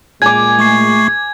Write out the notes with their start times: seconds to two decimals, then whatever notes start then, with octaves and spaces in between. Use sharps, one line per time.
0.22 A#2 G#3 G#4 G#5 D6 G#6
0.59 A3 C#6 C7